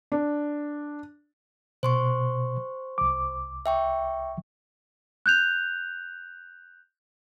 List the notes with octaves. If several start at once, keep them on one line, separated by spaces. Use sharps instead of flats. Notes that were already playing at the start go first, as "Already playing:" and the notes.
D4
B2 C5 C6 C#6
C2 D6
E5 G5 C#6
F#6 G6 F7